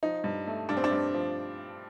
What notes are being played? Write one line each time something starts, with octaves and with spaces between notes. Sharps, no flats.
F3 D#4
G2
A3
G2 D4
C4
D4
G2
F3